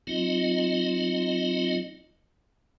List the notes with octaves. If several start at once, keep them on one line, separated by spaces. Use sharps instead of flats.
F#3 C4 D#4 F4 D#5